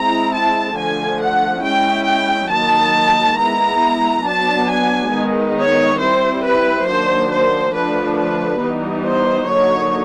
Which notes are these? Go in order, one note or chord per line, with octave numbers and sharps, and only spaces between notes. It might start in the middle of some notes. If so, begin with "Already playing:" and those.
Already playing: G#3 C4 E4 A#5
A5
D3 F3 A3 G#5
F#5
G#3 C#4 E4 G5
G5
D#3 F#3 A#3 D#4 A5
G#3 B3 E4 A#5
F#3 B3 D4 A5
G#5
D#3 G#3 B3 D#4
C#5
G3 C4 E4 C5
B4
D#3 F#3 A#3 D4 C5
C5
D3 F3 A3 D4 B4
B4
E3 G3 B3 D#4
C5
D3 F#3 A#3 D#4 C#5